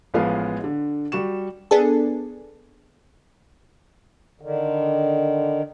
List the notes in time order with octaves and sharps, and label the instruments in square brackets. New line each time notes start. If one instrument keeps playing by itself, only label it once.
[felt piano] A1 F3 G#3 B3 F5
D3
G3 F#4 C#6 E7
[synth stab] B3 D4 G#4 A4
[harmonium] D3 D#3